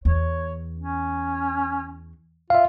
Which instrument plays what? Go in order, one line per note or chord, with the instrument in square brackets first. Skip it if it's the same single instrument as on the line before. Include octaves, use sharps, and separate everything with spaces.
[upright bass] E2 [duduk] C#5
[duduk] C#4
[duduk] F4 [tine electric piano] E5 F5